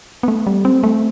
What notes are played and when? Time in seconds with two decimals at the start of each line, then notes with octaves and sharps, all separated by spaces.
0.23 B3
0.28 A3
0.47 G3
0.65 C4
0.83 A3